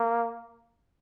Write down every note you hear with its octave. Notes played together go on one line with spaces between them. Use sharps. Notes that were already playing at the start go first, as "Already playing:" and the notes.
Already playing: A#3